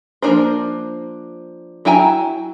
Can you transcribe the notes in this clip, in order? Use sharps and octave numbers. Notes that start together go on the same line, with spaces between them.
F3 A#3 D4 A#4 C5
F#3 E4 G5 G#5 A#5